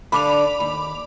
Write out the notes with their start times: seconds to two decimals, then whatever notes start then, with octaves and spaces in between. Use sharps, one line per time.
0.12 D3 D4 F5 B5 D6 F7
0.60 D#2